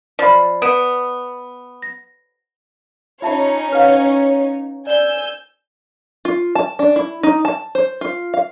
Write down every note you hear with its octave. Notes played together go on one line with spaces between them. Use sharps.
F3 D5 B5
B3 F#5 D7 E7
A#6
C#4 D#4 F4 C#5 E5 A5
B4 F5 F#5
D5 G#5 E6 G6
F4
A5
D4
E4
D#4
A5
C5
F4
F5